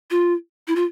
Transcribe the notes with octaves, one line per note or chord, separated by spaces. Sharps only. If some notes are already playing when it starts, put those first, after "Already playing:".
F4
E4
F4